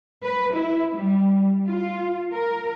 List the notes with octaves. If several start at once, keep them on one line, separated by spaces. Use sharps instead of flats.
B4
E4
G3
F4
A#4